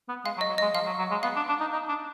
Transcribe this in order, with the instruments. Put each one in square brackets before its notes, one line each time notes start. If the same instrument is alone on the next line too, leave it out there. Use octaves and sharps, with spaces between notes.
[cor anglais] B3
[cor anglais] G#3 [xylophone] F5
[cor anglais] F#3
[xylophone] D#5
[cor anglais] F#3
[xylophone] D#5
[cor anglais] G#3
[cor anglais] F3 [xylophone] F5
[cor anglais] F#3
F#3
G#3
[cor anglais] B3 [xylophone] F5
[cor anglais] D4
D4
D#4
D#4
D4